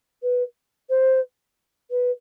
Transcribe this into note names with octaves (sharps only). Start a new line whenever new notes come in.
B4
C5
B4